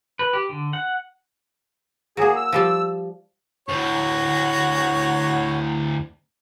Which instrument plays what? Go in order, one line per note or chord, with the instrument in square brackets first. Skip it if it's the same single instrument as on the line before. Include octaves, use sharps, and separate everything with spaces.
[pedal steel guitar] B4
G4
D3
F#5
[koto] F#3 A#3 [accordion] G#4
[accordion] E6
[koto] F3 G3 A5
[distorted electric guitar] D2 A2 [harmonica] F#4 C#5